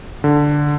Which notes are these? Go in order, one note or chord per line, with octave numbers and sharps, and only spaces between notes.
D3